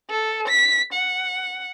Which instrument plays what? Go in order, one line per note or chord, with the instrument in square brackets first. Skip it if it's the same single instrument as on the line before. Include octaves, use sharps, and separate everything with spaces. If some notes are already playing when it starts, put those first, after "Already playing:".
[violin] A4
B6
F#5